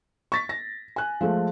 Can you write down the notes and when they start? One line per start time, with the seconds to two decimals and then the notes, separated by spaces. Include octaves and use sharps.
0.32 C#6 A6 B6
0.49 A#6
0.96 G#5 F#6
1.21 F3 G#3 A3